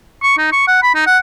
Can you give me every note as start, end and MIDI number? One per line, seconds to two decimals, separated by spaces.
0.23 0.36 85
0.38 0.48 63
0.52 0.63 85
0.68 0.78 78
0.82 0.92 83
0.95 1.03 63
1.07 1.18 78